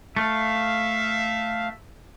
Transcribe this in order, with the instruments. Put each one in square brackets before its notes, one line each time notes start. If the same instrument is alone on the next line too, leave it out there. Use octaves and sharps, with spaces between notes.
[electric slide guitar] A3 [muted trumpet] E5 [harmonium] F5